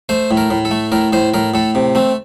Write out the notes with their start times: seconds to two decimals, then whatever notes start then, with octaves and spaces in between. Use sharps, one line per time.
0.09 A3 C5
0.31 A2
0.37 A#4
0.50 A2
0.65 A4
0.71 A3
0.92 A2 A#4
1.13 A2 C5
1.34 A2 A#4
1.54 A2 A4
1.75 C3
1.95 A3 C4